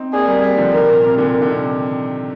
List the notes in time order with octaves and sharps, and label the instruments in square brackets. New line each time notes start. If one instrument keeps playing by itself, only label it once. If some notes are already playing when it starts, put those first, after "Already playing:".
Already playing: [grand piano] C4 D#4
[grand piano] A#3 D4 [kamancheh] G#4
[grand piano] G3 A#3
G3 A#3
D3 F3
[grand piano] C3 D#3 [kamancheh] A#4
[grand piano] A#2
C3
A#2 D3
D#3
D3
C3 D#3